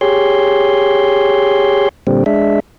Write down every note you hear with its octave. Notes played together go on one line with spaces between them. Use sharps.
G4 G#4 C#5 C6
A#2 D3 G3 C4
G#3 D4 E5